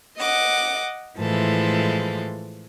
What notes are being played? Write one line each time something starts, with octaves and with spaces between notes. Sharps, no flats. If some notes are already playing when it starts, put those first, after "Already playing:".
D#5 F#5 D6
A2 E3 F3 G#3 A4